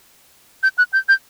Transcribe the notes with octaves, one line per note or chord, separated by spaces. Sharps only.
G6
F#6
G6
G6